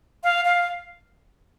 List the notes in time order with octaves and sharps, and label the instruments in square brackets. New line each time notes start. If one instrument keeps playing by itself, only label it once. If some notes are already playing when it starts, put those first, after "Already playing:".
[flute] F5
F5